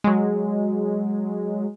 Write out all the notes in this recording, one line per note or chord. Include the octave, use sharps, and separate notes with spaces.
F#3 G#3